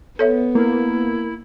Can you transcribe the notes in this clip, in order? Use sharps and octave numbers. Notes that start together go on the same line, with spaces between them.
B3 A4 C#5 E5
A#3 E4